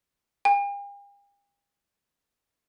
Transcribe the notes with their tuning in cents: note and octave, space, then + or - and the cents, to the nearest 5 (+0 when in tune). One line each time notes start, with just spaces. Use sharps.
G5 +45